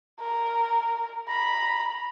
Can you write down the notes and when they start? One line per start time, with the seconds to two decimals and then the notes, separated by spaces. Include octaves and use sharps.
0.20 A#4
1.28 A#5 B5